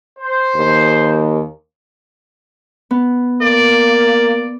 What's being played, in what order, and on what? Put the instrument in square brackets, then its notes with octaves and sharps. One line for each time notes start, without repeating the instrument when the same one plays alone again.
[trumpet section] C5
[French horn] D#2
[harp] B3
[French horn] A#3 [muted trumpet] D5